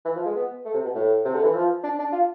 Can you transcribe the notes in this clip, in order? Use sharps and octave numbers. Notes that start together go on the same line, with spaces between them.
E3
F3
G#3
B3
A3
C3
B2
A2
C3
D3
E3
F3
D4
D4
F4